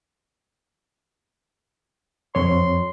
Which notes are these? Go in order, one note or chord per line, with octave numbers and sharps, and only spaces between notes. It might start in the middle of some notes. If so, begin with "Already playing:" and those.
F2 C#5 C6